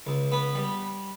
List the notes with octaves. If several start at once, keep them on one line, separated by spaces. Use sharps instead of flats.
C#2
B3
G3